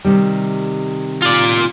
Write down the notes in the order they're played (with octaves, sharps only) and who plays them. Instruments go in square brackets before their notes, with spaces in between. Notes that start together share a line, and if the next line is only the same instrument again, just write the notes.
[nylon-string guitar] C3 D#3 G3
[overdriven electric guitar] F4 D5